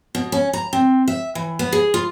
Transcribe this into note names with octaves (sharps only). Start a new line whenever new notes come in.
B2
C#4
A#5
C4
E5
E3
B3
G#4
F4